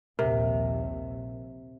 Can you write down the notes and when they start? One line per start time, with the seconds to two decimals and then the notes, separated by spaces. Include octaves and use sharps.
0.19 A#1 D#2 C3 A#4